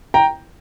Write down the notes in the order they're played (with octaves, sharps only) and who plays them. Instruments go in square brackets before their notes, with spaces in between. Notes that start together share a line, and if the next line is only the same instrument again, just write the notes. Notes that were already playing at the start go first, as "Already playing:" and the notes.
[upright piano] G5 A#5